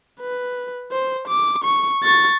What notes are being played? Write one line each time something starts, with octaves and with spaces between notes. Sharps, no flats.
B4
C5
D6
C#6
C#6 A6